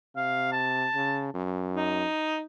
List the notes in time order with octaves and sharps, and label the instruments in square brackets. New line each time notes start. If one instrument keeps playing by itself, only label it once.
[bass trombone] C3 [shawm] F5
[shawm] A5
[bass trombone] C#3
F#2
[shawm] D#4